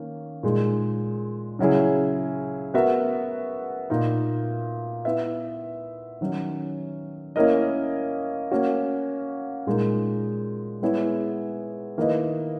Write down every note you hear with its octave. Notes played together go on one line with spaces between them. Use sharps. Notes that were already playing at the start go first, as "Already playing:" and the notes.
Already playing: D#3 A#3 C#4
A#2 G#3 D#4 G#4
C#3 F#3 C#4 E4 G#4
B3 F#4 A#4 E5
A#2 A#3 D#4
B3 E4 B4 E5
D#3 F#3 C#4
A#3 C#4 E4 A#4 D#5
A#3 C#4 F#4
A#2 G#3 D#4 A#4
G#3 B3 E4 G#4 C#5
D#3 A#3 E4 B4 D#5